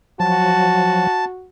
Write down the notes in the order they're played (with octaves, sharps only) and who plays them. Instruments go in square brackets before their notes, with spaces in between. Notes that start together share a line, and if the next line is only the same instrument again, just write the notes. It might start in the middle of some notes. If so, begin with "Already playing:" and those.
[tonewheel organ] F3 F#3 [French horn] F#4 [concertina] A5